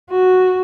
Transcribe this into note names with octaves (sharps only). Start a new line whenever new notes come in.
F#4